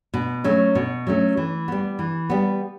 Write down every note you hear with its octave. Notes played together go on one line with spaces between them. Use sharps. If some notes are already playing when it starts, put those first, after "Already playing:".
B2
F#3 A3 C#4
B2
F#3 A3 C#4
E3
G3 B3
E3
G3 B3